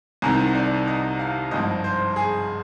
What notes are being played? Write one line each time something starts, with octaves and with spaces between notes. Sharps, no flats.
C2 C3 D#3 A#5
D5
D#5
F5
G#1 G2 F3 D#5
C5
G#4